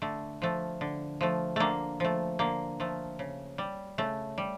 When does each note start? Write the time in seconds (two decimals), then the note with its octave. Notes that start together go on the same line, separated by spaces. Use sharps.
0.02 D3 A3
0.42 F3 A3
0.81 D3
1.21 F3 A3
1.56 D3 A3 A#3
2.00 F3 A3
2.39 D3 A#3
2.80 F3 A3
3.19 C#3
3.58 G3
3.98 C#3 A3
4.38 G3